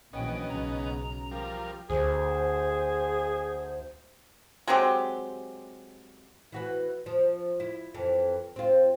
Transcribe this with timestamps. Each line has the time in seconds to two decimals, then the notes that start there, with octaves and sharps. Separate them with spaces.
0.13 A#1 E3 F#3 B3 C#4 D#5 G5
0.48 B1 C#3 A#5
1.31 F3 G3 A#4
1.90 D2 G#4 C5
4.68 F#3 G#3 C4 G4
6.52 E3 F#4 B4
7.06 F3
7.60 E4
7.94 F2 E3
8.56 C4 F4